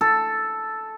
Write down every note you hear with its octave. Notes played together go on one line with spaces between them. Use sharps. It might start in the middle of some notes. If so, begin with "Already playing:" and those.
A4